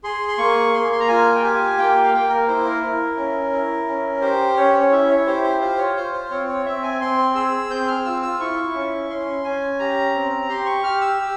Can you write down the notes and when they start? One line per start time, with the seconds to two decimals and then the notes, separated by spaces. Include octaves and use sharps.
0.04 G#4 C6
0.28 C6
0.38 A#3 C#6
0.74 A#3 C6
0.92 C6
1.00 A#5
1.08 F4 G#5
1.36 G5
1.43 G4 G#5
1.77 A#3 G5
2.04 F5
2.13 A#3 G5
2.30 A#4
2.48 E4 C5
2.65 A#4
2.83 E4
3.17 C#4
3.52 E4
3.87 C#4
4.21 G4 C5
4.57 C#4 C#5
4.80 C#5
4.91 E4 E5
5.10 C#5
5.26 G4 C5
5.43 C5
5.61 F4 C5
5.78 C#5
5.96 F4 C5
6.13 C5
6.30 C4 C#5
6.48 C#5
6.66 C4 E5
6.83 G#5
7.01 C4 C6
7.35 G#4 E6
7.70 C4 G6
7.88 F6
8.05 F4 E6
8.22 E6
8.40 E4 C#6
8.74 C#4
9.10 C#4 C6
9.44 C#4 G#5
9.79 G4 A#5
10.14 C4
10.49 G4 C6
10.66 C#6
10.84 G4 F6
11.01 E6
11.19 G4